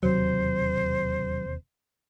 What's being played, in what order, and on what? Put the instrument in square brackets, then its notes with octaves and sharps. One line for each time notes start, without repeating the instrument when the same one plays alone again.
[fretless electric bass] E1 D#2 C3 [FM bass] F#3 [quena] C5